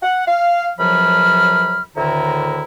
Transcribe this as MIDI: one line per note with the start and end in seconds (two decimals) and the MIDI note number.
0.02 0.26 78
0.27 0.70 77
0.79 1.82 37
0.79 1.82 42
0.79 1.82 53
0.79 1.82 54
0.79 1.82 83
0.79 1.82 89
1.95 2.63 38
1.95 2.63 45
1.95 2.63 50
1.95 2.63 51
1.95 2.63 64
1.95 2.63 82